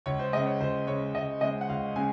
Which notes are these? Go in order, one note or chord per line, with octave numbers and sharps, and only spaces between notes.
C#2 C#5
C5
C#3 G#3 D#5
C#5
C#2 C5
C#3 G#3 C#5
C#2 D#5
C#3 G#3 D#5
F#5
C#2 F5
C#3 G#3 G#5